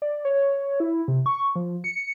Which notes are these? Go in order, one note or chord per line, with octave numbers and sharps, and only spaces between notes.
D5
C#5
E4
C3
C#6
F3
C#7